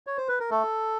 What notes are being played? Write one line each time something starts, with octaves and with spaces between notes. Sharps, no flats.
C#5
C5
B4
A#4
A3 A4